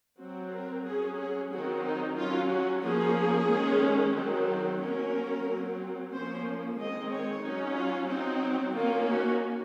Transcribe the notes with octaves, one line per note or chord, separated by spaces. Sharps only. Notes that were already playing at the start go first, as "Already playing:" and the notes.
F#3 C4 F#4
A#4
F#3 C#4 G#4
G#4
D#3 F#3 C4 F#4
D#4
F#3 C#4 F4
F#4
F3 A#3 C#4 G#4
D#3 G#3 C#4
D#3 F#3 C4
F#3 A#3 C#4 A#4
F#3 C4
F3 A#3 C#4 C5
D#3 G#3 C4 D#5
C#5
F#3 C#4 D#4
F4
F#3 C4 D#4
D#3 A#3 C#4 F4
F#4